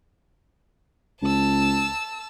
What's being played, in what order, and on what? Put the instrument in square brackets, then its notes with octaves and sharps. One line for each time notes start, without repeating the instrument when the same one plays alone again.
[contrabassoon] C#2 [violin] A5 E6